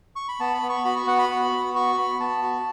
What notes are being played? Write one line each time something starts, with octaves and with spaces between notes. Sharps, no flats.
C#6
B5
B3 A5
B5
B3
C#6
F#4 B5
C#6
B3 F#5
B5
F#4
B3
F#4 C#6
B3 B5
B3 A5
F#4